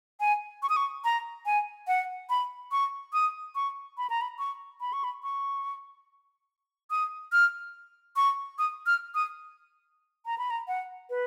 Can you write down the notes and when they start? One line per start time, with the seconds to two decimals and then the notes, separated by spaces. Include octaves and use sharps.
0.20 G#5
0.63 C#6
0.69 D#6
0.76 C#6
1.04 A#5
1.46 G#5
1.88 F#5
2.30 B5
2.72 C#6
3.13 D#6
3.55 C#6
3.98 B5
4.10 A#5
4.21 B5
4.39 C#6
4.81 B5
4.93 C#6
5.04 B5
5.23 C#6
6.90 D#6
7.32 F6
8.16 C#6
8.59 D#6
8.86 F6
9.15 D#6
10.26 A#5
10.38 B5
10.50 A#5
10.68 F#5
11.10 B4